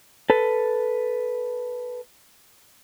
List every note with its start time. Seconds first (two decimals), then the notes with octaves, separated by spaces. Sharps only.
0.30 A4 B4